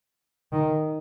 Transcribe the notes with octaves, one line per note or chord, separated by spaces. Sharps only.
D#3